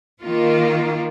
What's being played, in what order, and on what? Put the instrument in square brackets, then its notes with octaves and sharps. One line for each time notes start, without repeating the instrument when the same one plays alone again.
[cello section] D#3 A#3 F4